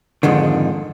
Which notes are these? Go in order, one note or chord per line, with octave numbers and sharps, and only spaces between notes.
F2 G#2 D3 D#3